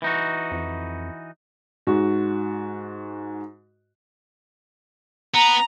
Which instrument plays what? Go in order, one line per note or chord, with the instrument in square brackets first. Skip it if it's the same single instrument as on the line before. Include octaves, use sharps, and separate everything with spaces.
[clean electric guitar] E3 D#4 F#4
[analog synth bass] F2
[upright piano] G#2 F#4
[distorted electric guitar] B3 [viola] A#5